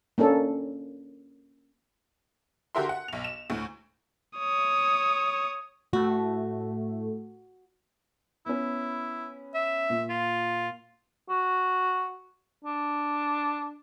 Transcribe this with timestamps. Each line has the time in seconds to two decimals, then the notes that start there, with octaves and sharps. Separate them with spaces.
0.18 A#3 C#4 D4 A4
2.75 D3 F#4 G4 A#4 E5 C6
2.89 F#5
3.08 B1 F7
3.24 E7
3.50 D2 A2
4.38 C#5 D#6
5.93 A2 A3 F#4
8.46 B3 C#4 E4
9.55 E5
9.90 A#2
10.10 F4
11.29 F#4
12.64 D4